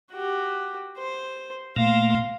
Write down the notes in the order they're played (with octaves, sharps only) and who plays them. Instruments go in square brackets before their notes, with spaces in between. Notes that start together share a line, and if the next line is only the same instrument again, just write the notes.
[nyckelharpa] F#4 G4
C5
[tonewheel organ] A#2 A3 A#3 [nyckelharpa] F5 C6